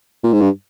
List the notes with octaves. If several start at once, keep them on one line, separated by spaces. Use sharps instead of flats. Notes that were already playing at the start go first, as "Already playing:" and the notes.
A#2
G#2
G2